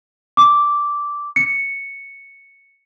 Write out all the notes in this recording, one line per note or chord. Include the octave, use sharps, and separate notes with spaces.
D6
C#7